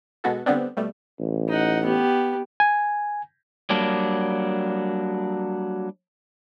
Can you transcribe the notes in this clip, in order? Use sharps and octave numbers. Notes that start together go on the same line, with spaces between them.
B2 G#3 B3 F#4 A4
D3 G3 B3 C4 D4
B2 G3 A3
A1
D#4 F#5
B3 G4
G#5
F#3 G3 A#3 D4